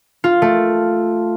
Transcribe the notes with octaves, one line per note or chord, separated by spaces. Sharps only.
F4
A3